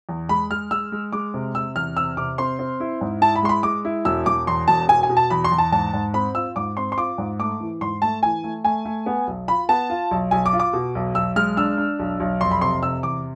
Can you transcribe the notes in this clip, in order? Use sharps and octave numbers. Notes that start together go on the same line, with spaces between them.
E2
G#3 B5
G#3 F6
G#3 E6
G#3
G#3 D6
C3
C3 E6
E2 F6
C3 E6
C3 D6
C4 C6
C4
E4
G#2
E4 A5
B5
G#3 C6
B5
G#3 D6
E4
E1 E6
E1 D6
E2 C6
E1 A5
B2 G#5
G#5
B2
A5
E2 B5
C6
E2
A5
G#2 A5
G#2
C4 B5
F4 E6
G#2 D6
C4 C6
C6
F4 D6
G#2
A3 D6
E3
G#2 C6
A3 A5
E3 G#5
A3
A3 G#5
A3
B3
B1
F4 B5
B3 A5
F4
B1
B1 G#5
D6
F4
D6
B2
B1
B1 E6
G#3 F6
D4 E6
D4
B1
B1
F1 C6
B5
C3 C6
C3 E6
E2 D6